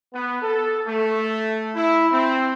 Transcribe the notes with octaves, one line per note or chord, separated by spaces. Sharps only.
B3
A4
A3
E4
C4